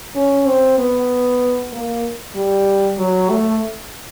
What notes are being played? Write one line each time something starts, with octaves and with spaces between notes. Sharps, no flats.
C#4
C4
B3
A#3
G3
F#3
A3